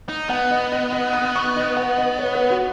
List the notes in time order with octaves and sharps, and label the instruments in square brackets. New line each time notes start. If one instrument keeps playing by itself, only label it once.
[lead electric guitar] D#4
[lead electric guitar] B3 [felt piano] F#5
[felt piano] D#5
D#5
D#5
D#6
C#6
D#5
F#5
D#5
C#5
B4
F#4